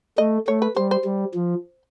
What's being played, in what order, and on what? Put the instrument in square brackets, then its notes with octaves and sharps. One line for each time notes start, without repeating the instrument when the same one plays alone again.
[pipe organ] A3 [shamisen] D#5
[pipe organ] A3 [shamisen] C#5
[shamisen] B4
[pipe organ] G3 [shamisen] C5
[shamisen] C5
[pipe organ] G3
F3